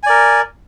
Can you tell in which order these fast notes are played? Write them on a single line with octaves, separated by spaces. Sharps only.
G#5 D5 A#4